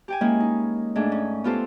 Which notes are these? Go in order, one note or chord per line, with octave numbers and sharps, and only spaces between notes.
G4 G5 G#5
G#3 A#3 C#4 E4
D#4
G#2 A3 D4 G#4
C#4
B3 F4 G4 A4 C5